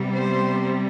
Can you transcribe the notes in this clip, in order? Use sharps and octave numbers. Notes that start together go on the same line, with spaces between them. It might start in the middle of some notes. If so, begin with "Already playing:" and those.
Already playing: C3 G3 B3
C5